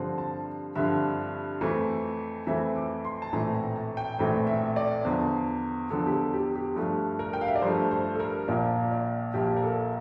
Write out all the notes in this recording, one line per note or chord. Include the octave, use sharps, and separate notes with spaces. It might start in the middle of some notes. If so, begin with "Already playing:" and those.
Already playing: G2 D3 F3 C4
A5
G2 D3 F3 C4 E5
F2 E3 A3 C4
F2 E3 A3 C4 E5
D6
C6
A5
A#1 A2 E3 A3 C4 A#5
A#5
A5
G5
A#1 A2 E3 A3 C4
E5
D5
E2 D3 F3 C5
E2 D3 F3 A4
G4
A4
G4
G4
G2 F3 A3
A#4
G5
F5
E5
D5
G2 F3 A3 C5
C5
A4
A#4
A#1 A#2 F3 A#3 D5
D5
A#1 A#2 F3 A#3 G4
A#4
A4